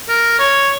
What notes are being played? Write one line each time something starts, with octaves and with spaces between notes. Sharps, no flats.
A#4
C#5